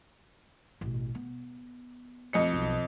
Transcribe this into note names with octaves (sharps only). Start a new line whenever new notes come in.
A1 B2
B3
F2 D#5 C#7
B1